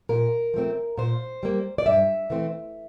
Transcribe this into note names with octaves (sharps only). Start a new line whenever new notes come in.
A#2 A#4
F3 A3 C4
A#2 C5
G3 A#3
D5
G2 E5
E3 A3 C4